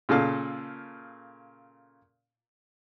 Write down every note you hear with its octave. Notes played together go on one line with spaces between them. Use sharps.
A#2 C#3 A4 F5